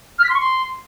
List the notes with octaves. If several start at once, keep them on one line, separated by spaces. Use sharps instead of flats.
F6
B6
C6
C#6
C6